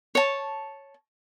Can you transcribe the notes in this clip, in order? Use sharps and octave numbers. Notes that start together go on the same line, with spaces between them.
C#5 A5